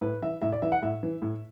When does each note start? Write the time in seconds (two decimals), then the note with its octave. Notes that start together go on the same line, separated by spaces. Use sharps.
0.01 A2 B4
0.22 E3 E5
0.42 A2 E5
0.52 D5
0.62 E3 E5
0.72 F#5
0.82 A2 E5
1.03 E3
1.22 A2